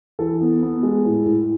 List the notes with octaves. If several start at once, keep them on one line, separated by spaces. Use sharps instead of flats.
E3 A4
B3
B3
G#3
A2
A2